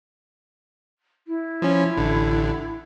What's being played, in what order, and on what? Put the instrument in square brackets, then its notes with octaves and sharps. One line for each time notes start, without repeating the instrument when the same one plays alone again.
[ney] E4
[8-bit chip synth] F3 C#4
A1 D3